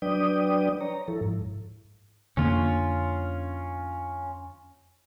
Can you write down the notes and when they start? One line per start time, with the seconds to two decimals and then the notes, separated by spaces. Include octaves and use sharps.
0.02 F#3 D4 B4 D5 G5 D#6
0.81 C#5 A#5
1.08 F3 E4 A4
1.21 G#2
2.37 F2 D3 A#3 C#4 F4